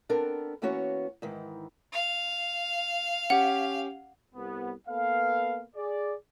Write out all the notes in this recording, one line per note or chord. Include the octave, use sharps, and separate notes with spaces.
B3 C4 D4 A4 A#4
E3 A#3 B3 C#4 F#4 C#5
G#2 D#3 E3
F5
C#4 G4 F#5
C2 B3
A#3 B3 A4 B4 F5
G#4 D5